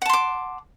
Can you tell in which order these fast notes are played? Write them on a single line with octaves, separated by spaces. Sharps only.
F#5 A5 C6 D6